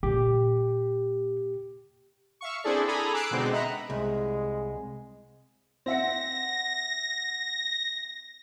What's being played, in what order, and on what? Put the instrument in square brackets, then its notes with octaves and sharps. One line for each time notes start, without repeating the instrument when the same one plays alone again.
[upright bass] A#2 [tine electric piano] G4
[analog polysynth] E5 F5 C#6
C4 D4 E4 G#4 A4 D5
G#4 A4 G#5 A#5 B5
D6 E6 F#6 C7 D7
B2 D3 G#3 B3 C4 D#4
D#5 E5 F#5 A#5 B5
[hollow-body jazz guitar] C2 [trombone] G#3
[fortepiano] C4 E5 F#5 [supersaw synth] A#6